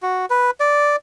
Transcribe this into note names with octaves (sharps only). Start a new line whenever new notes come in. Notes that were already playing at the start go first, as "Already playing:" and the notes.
F#4
B4
D5